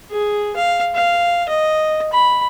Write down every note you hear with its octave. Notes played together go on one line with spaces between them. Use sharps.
G#4
F5
F5
D#5
B5